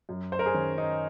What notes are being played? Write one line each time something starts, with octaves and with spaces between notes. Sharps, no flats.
F#2
C5
A#4
G#4 C5
D#3 C#4
D#4